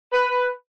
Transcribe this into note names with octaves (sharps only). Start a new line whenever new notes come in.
B4